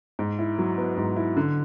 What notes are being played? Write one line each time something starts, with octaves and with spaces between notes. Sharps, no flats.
G#2
E4
F#3
B3
G#2
E4
D3